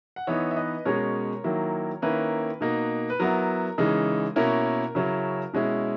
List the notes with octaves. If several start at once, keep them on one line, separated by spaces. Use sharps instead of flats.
F#5
E3 B3 D#4 C#5 E5
E5
B4 D#5
B2 G#3 C#4 A#4 C#5
D#3 F#3 A#3 E4
D#3 A#3 C#4 E4 B4
B2 A#3 D#4
B4
F#3 B3 E4 A#4
C#3 E3 G#3 D#4
B2 A#3 C#4 E4 A#4
C#3 F#3 C#4 E4
B2 G#3 C#4 E4